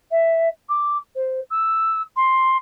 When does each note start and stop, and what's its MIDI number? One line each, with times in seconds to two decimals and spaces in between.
0.11 0.48 76
0.69 0.97 86
1.15 1.40 72
1.50 2.01 88
2.16 2.57 84